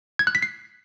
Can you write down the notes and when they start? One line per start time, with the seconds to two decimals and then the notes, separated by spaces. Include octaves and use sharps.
0.19 G#6
0.27 F#6
0.35 B6
0.42 C7